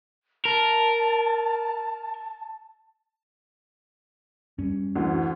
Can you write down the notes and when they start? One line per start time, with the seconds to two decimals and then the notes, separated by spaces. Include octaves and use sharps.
0.45 A#4 A5
4.59 F#2 G3 C#4
4.96 D2 D3 E3